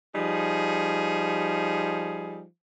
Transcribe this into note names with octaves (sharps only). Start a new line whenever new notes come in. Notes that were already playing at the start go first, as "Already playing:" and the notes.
F3 G3 D#4 G#4